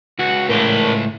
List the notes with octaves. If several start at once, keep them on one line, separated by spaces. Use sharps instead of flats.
C#2 F#4
A2 A#4 C5